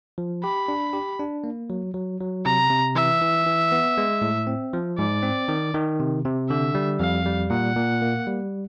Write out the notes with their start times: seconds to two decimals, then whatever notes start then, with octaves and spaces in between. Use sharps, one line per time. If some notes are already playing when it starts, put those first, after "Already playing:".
0.18 F3
0.44 G4 B5
0.68 D4
0.93 G4
1.19 D4
1.44 A#3
1.70 F#3
1.94 F#3
2.21 F#3
2.45 C3 A#5
2.70 C3
2.95 E3 E5
3.21 E3
3.46 E3
3.72 B3
3.98 G#3
4.22 A2
4.47 C4
4.73 F3
4.98 G#2 D5
5.23 C4
5.48 D#3
5.74 D#3
6.00 C3
6.25 C3
6.49 D3 E5
6.75 G3
7.00 F2 F5
7.26 G3
7.50 A#2 F#5
7.76 A#2
8.02 A#3
8.27 G3